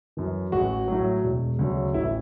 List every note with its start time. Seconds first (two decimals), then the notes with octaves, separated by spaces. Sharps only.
0.17 F#2 E3
0.52 A1 F#4
0.88 A2 F#3
1.24 E1
1.59 D2 C#3 F#3
1.94 A1 E4